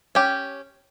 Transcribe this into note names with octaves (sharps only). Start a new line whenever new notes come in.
C#4 G4